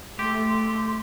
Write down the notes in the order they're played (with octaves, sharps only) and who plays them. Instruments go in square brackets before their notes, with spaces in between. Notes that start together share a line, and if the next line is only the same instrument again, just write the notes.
[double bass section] A3 [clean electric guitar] G4 [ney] C6